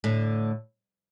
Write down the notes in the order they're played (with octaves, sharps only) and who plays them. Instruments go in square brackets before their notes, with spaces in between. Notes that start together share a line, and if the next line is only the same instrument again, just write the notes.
[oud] A2 D3